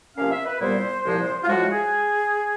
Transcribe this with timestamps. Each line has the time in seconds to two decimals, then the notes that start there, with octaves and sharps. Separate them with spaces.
0.17 C3 F3 A#3 C#4 F5
0.31 E5
0.46 B4
0.60 C2 A#2 G3 B3 E4 C5
1.05 C2 A#2 F3 G#3
1.43 F4
1.48 A2 F3 G#3 F#4
1.70 G#4